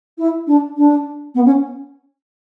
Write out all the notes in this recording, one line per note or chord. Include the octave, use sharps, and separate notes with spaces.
E4
D4
D4
B3
C#4